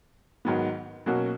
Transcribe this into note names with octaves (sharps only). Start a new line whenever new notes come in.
G#2 D#3 F#3 B3
B2 F#3 A#3 C#4 F#4